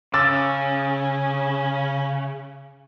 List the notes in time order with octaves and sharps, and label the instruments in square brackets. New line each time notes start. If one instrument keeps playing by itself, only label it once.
[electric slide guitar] C#3 [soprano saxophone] C#4 [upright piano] D6 E6 A6